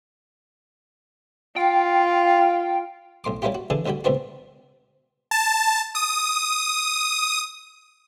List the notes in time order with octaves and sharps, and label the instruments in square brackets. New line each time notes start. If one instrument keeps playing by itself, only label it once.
[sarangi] F4 [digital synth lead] G5
[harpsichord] B1 A2 C6 D6
G3 A#3 C#4 E4 F4 G4
F#4
D3 E3 D4 G#4 A4
D2 D3 G3 F#4 G5
C#2 A#2 B3 C4 D4 F#4
[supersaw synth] A5
D#6